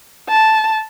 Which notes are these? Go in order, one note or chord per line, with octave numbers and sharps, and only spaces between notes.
A5